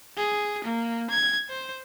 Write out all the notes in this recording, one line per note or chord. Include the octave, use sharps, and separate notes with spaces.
G#4
A#3
G#6
C5